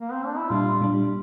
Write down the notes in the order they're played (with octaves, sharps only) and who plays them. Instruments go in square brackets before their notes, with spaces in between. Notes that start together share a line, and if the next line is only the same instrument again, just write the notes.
[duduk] A#3
C4
D4
E4
[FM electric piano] A#2 G3 D4 [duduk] F4
[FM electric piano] A#2 G3 D4